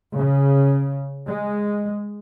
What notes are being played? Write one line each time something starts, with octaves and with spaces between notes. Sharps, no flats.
C#3
G#3